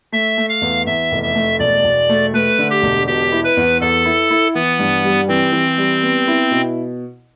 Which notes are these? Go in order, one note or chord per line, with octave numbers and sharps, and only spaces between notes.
A3 E5
A3
F5
E2
E2 E5
F1
E5
A3
E1 D5
E1
A3
A3 B4
D3
G4
E1
B2 G4
E4
B4
E2
E2 A4
E4
E4
E3 B3
G2
G3
E3 C4
E3
G3
B3
E4
B2